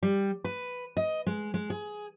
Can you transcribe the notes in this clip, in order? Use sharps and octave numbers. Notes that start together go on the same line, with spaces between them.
G3
B4
D#5
G#3
G#3
G#4